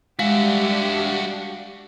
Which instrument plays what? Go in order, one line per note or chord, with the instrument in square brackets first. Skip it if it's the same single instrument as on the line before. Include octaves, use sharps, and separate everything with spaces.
[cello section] G3 D4 G4 [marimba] G#3 [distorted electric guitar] F#4 E5 [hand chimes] F5